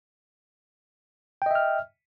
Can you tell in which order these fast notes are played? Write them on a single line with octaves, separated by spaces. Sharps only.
G5 D#5 E5 F6